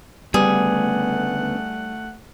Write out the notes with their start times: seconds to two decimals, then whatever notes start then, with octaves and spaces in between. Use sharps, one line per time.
0.34 D2 C#3 G3 A3 B3 G#4 F#5